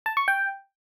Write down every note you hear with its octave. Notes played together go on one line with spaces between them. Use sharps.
A5
C#6
G5